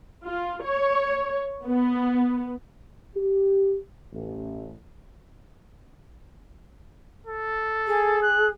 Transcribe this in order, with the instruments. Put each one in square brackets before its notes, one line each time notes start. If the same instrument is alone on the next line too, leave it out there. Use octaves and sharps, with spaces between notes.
[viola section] F4
C#5
B3
[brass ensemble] G4
A1
[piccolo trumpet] A4
[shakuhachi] G#4
[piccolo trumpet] F#6